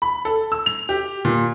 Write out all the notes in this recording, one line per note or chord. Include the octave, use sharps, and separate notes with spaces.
B5
A4
E6
F7
G4
A#2